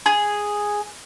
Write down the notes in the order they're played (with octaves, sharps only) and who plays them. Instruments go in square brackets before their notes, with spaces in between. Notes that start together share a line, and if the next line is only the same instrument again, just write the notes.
[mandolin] G#4